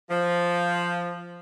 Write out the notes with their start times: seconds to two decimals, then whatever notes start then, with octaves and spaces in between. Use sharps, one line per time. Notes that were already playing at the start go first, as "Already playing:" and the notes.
0.10 F3